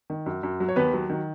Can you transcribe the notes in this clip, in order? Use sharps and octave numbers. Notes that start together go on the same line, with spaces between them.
D#3
F#2
F#2
F#3
C#5
D#2 B3 B4
F#3
D#3